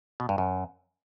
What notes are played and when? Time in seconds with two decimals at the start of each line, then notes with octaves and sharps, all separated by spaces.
0.20 B2
0.29 G2
0.38 F#2